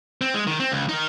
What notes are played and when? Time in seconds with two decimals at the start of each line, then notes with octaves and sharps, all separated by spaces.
0.21 C4
0.34 G#3
0.47 D#3
0.60 C4
0.72 C#2
0.89 D#4 A#4